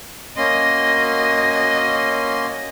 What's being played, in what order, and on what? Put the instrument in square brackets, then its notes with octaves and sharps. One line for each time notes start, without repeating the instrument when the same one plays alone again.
[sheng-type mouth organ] A#3 C#4 C6 [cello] F#4 D#5